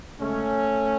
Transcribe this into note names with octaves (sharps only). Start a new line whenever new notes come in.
C#3 G#3 A3 C#4